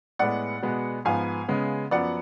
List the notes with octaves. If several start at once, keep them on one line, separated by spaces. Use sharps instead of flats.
A2 G#3 B3 D5 F#5
B2 G#3 B3
G#2 F3 B3 F5 G#5
C#3 G#3 B3
F#2 F3 B3 D5 F#5